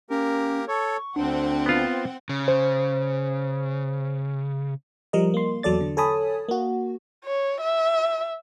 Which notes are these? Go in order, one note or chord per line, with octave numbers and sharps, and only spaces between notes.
A#3 C#4 G4 A#4
A4 C#5 C#6
D2 C4 D4 F#5
B3 F4
C#3
C5
F3 G3 A#4 D#5
A#3 C6
E2 F#3 A4 D5 A6
D3
A4 C#5 G#5 A5 B5 D#6
A#3 F#4
C#5
E5